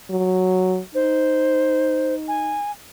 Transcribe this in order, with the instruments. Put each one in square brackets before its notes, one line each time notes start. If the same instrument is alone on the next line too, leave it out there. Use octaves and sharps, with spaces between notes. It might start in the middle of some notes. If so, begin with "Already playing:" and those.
[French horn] F#3
[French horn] D#4 [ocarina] C5
[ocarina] G#5